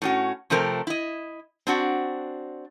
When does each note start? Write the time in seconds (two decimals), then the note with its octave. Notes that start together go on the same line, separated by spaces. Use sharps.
0.02 A2 C#4 F#4
0.50 C3 F3 A3 C4 A#4
0.87 E4 D#5
1.67 C4 D4 F#4